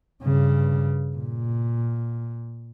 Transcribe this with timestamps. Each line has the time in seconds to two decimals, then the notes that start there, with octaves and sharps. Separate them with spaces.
0.23 G2 C#3
1.16 A#2